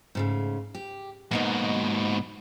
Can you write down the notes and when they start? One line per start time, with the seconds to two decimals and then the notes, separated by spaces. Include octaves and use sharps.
0.15 G#2 C#3 A3
0.75 G4
1.31 G#2 B2 A#3 B3 D#4